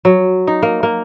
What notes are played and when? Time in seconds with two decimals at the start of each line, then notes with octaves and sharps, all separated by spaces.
0.05 F#3
0.47 D#4
0.62 A#3
0.83 A#3